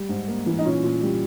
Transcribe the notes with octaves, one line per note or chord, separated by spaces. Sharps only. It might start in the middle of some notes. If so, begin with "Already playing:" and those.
Already playing: G3
G#2
A#3
E3
D#4
A#2 C#4
A#2
G3